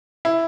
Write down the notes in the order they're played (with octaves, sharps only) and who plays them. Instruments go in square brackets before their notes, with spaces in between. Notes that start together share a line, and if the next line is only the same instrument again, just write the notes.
[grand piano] E4